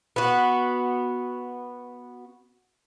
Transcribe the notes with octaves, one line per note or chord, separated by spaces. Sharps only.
B3 F#4